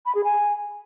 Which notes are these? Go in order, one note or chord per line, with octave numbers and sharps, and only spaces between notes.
B5
G#4
G#5